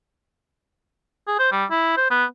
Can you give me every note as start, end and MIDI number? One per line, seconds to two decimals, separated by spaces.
1.28 1.36 68
1.39 1.49 72
1.52 1.65 55
1.70 1.95 64
1.97 2.10 72
2.11 2.25 59